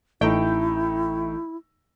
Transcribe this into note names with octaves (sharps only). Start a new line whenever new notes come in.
A1 A3 D#4 E4 G5